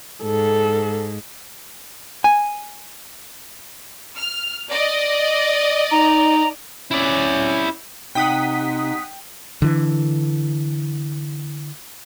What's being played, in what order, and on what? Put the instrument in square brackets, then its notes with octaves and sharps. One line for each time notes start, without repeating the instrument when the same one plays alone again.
[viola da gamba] G#2 [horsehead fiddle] A4
[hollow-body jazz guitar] G#5
[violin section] F6
[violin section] D5 D#5 [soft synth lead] A#6
[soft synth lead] D#4 [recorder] A#5
[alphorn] C#4 [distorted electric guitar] E4 D5
[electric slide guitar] C3 [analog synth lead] D#4 [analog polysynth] F#5 D#6 B6 [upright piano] G5
[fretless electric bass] D3 E3